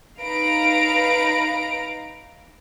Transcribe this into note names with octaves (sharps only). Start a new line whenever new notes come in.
D#4 B4 F5 A#5 D7